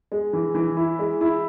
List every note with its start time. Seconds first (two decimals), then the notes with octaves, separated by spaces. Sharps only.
0.12 G#3
0.33 E3
0.55 E3
0.77 E4
0.99 G#3
1.21 E4